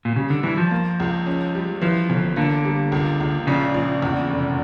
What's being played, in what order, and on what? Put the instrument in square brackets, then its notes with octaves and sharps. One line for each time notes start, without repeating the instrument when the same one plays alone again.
[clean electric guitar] A#2
[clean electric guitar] C#3 [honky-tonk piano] G3
[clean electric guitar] D3
[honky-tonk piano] G2 [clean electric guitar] E3
[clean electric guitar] F3
[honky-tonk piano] A#3
C#2
C#4
G3
[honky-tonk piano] E3 [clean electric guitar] F3
[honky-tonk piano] G1
[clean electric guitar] D3 [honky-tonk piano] A#3
[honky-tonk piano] G3
C#2
C#2
[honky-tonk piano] A#1 [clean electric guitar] C#3
[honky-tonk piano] A#1
E2
F1